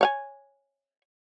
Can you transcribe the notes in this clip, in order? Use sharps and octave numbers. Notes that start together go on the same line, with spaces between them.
C#5 F5 G#5